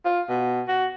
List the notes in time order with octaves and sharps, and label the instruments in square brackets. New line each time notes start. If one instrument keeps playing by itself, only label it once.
[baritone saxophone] F4
B2
F#4